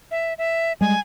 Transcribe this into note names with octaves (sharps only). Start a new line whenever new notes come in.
E5
E5
G3 G#3 G#5